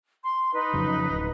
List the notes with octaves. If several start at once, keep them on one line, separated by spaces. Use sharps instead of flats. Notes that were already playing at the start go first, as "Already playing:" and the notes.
C6
D#4 B4
F2 C#3 F#3
D1